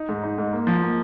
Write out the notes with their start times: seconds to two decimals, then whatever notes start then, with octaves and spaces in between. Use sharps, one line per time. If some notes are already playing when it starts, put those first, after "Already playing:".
Already playing: D#4
0.09 G#2
0.23 D#4
0.38 G#2
0.53 A#3
0.67 F3
0.83 A#3